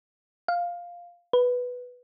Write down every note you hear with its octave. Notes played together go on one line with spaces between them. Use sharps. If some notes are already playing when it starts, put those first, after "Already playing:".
F5
B4